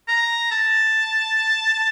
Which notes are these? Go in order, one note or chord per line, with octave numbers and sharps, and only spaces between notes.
A#5
A5